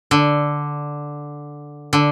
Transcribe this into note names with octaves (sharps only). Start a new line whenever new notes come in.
D3
D3